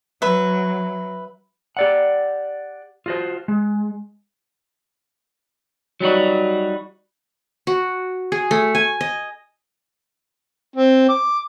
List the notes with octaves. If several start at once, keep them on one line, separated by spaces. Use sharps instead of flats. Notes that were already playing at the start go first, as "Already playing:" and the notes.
F#3 B4 E5
G4 D5 F#5
F4 F#4 C5
G#3
F#3 G3 D#4 F#4
F#4
G#4
A3
G#5
D#5
C4
D6